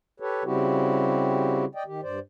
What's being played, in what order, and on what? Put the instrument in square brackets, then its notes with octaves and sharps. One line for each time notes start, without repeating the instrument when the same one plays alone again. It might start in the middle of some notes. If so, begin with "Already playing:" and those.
[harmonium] G4 A4 B4 C#5
C#3 G3 C4 E4 F#4 G4
D5 D#5 G5
D#3 G4
G2 C5 D5